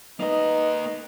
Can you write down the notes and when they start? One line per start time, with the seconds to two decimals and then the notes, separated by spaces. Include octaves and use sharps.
0.20 A#3 D#4 B4 D#5